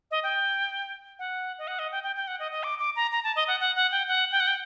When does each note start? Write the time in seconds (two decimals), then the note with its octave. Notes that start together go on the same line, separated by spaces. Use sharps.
0.11 D#5
0.23 G5
1.19 F#5
1.59 D#5
1.68 F#5
1.79 D#5
1.92 G5
2.03 G5
2.16 G5
2.28 F#5
2.40 D#5
2.52 D#5
2.63 D6
2.79 D6
2.96 A#5
3.12 A#5
3.24 A5
3.36 D#5
3.48 F#5
3.60 F#5
3.76 F#5
3.92 G5
4.08 F#5
4.32 G5
4.40 F#5
4.47 G5